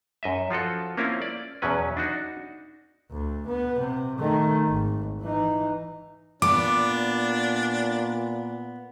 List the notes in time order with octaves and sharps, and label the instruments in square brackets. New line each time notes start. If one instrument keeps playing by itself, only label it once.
[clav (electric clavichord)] F#2 D#5 E5
F3 F4 F#4 A4
A#3 C4 C#4 E4 F4
D5
E2 B2 F#3 C#4 B4
D4 D#4 F#4
[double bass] D2
B3
C3
D#3 A3
G#1
E3 D#4
[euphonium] A#2 [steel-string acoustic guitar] B3 [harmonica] D4 [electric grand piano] D6